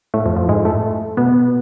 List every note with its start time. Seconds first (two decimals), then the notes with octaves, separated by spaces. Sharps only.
0.14 A2 A3
0.26 F2 F3
0.36 F2 F3
0.48 G#2 G#3
0.65 A2 A3
1.17 B2 B3